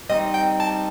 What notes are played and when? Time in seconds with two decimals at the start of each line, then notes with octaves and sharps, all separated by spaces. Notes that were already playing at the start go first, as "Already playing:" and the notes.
0.09 G3 C4 D#4 D#5
0.34 G5
0.60 A5